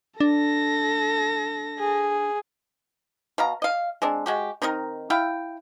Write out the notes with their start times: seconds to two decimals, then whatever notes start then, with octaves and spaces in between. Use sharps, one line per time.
0.20 D4 A4 A#6
1.79 G#4
3.38 B2 F5 A#5
3.62 D#5 F5
4.02 G#3 C4 D4
4.26 G#3 F#4 G4
4.62 D#3 C4 D#4 A#4
5.10 E4 F5 G5